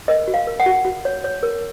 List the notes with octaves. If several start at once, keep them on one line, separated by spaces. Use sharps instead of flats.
A#4 D#5
F#4
F5
A#4
F#5
F#4
F#4
C#5
C#5
A#4